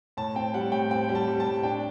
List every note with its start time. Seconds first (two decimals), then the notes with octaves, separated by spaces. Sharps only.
0.17 A2 A5
0.35 C4 G5
0.54 G3 F#5
0.72 A2 G5
0.90 C4 G5
1.09 G3
1.15 A5
1.28 G3
1.40 A5
1.46 A2
1.63 D4 G5